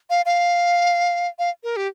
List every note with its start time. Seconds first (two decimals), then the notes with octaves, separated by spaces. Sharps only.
0.10 F5
0.26 F5
1.39 F5
1.64 A#4
1.76 G4